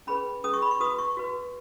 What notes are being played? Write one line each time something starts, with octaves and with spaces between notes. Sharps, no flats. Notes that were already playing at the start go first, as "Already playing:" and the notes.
C#4 G#4 B4 B5
C#4 G#4 B4 D#6
C#6
B5
C#6
F#4 B4 D#6
C#6
F#4 B4